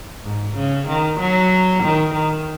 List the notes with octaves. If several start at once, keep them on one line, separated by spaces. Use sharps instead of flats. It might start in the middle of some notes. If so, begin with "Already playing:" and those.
G#2
C#3
D#3
F#3
D#3
D#3